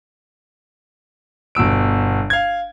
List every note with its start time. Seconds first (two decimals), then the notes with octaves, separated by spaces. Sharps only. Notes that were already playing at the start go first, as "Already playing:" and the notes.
1.55 G1 B2 E6 D7
2.30 F5 G#6